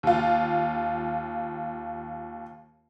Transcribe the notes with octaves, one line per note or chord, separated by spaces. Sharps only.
D#2 F4